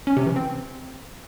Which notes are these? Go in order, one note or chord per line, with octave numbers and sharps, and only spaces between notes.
C#4
C3
E3
C4